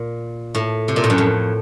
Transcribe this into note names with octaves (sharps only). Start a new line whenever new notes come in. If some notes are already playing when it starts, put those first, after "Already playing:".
Already playing: A#2
A2
C3
A#2
A2
F#2
F2